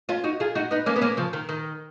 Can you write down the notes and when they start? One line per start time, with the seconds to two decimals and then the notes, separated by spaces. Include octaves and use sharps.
0.09 C#4 F4
0.24 D#4 F#4
0.40 F4 G#4
0.55 D#4 F#4
0.71 B3 D#4
0.86 A#3 C#4
0.96 B3
1.01 A#3 C#4
1.17 C#3 F3
1.33 D#3
1.49 D#3